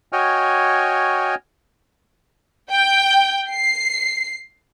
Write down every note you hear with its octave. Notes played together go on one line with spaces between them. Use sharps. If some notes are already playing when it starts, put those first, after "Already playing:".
F#4 C#5 D#5 G5 G#5 F6
G5
C7